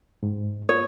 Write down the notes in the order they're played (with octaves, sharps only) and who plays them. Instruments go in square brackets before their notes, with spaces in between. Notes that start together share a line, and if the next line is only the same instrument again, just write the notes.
[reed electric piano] G#2
[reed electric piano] A#3 F4 D#6 [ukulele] C#5